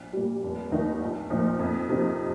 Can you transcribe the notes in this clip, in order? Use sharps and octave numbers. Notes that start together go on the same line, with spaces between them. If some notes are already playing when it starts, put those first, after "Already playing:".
Already playing: A#1
A#2 G3
F1
D#2 D#3 A#3 D#4
A#1
A#2 F3 D#4
F2
C3 F3 A#3 D#4